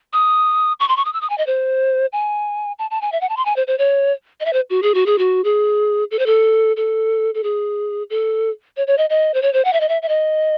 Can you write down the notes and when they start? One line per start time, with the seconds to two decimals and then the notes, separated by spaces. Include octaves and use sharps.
0.13 D#6
0.80 C#6
0.89 C6
0.97 C#6
1.05 D#6
1.13 E6
1.21 D#6
1.30 G#5
1.38 D#5
1.47 C5
2.13 G#5
2.79 A5
2.91 A5
3.02 G#5
3.12 E5
3.21 F#5
3.29 A5
3.37 C6
3.46 G#5
3.56 C5
3.67 C5
3.78 C#5
4.40 D#5
4.45 E5
4.53 C5
4.70 F#4
4.82 G#4
4.94 F#4
5.06 G#4
5.18 F#4
5.44 G#4
6.11 A4
6.19 C5
6.26 A4
6.77 A4
7.35 A4
7.43 G#4
8.10 A4
8.77 C#5
8.87 C#5
8.98 D#5
9.10 D#5
9.34 C5
9.42 C#5
9.53 C5
9.65 F#5
9.73 E5
9.80 D#5
9.89 E5
10.02 E5
10.09 D#5